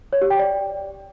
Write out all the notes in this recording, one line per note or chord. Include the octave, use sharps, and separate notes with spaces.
C#5
G4
G5
D5